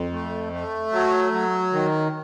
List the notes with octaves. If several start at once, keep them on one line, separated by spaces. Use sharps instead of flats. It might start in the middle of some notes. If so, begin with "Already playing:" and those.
Already playing: F2
A3
A3
F#3
F#3
D#3